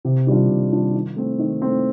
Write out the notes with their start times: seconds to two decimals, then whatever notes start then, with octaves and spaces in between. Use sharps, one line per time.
0.05 C3
0.27 D#3 G3 D4 F4
0.49 C3
0.71 D#3 G3 D4 F4
0.94 D#3
1.17 A3 C4
1.39 D#3
1.62 A3 C4